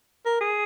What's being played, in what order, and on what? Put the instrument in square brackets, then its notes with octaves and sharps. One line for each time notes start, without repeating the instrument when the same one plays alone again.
[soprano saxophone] A#4
G#4